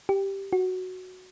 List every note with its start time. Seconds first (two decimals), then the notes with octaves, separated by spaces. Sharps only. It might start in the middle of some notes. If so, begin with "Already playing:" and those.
0.09 G4
0.53 F#4